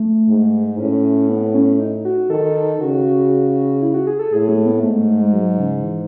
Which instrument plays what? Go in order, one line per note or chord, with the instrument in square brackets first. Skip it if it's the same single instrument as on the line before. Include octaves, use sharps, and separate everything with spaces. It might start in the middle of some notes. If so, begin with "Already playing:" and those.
Already playing: [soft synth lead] A3
[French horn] G#2
[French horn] A2 [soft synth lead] C#4
[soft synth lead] B3
B3
C#4
D#4
F#4
[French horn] D#3 [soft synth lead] A4
[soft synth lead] A4
[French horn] C#3 [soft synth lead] F#4
[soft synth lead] E4
F#4
G#4
A4
[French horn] A2 [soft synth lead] G#4
[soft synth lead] A3
B3
[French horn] G#2 [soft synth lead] A3
[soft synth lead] A3
A3
G#3
F#3
C#3
E3